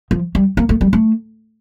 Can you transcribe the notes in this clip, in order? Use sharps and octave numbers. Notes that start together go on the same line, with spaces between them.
F3
G3
A#3
A3
G3
A3